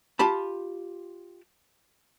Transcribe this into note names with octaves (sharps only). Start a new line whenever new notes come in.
F4 G4 A5 B5